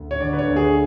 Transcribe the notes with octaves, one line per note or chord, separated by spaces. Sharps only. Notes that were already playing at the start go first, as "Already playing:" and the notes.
Already playing: D2
C#5
D3 D5
B4
C#5
D2
G#4